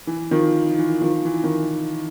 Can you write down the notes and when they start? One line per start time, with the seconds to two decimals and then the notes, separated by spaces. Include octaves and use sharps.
0.07 E3
0.31 D#3 F3
0.78 E3
1.02 D#3 F3
1.25 E3
1.44 D#3
1.48 E3